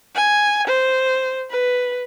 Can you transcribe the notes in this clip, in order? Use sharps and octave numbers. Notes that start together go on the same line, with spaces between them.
G#5
C5
B4